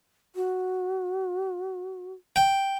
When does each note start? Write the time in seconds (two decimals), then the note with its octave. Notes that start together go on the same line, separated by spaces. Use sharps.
0.35 F#4
2.36 G5